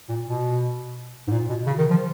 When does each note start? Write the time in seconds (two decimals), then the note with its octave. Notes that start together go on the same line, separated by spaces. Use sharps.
0.09 A#2
0.27 B2
1.28 G#2
1.32 A#2
1.49 B2
1.67 C#3
1.78 D#3
1.90 F3